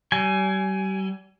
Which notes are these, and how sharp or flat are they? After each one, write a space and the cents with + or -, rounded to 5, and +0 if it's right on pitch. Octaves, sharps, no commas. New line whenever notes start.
G3 -35 G#5 +10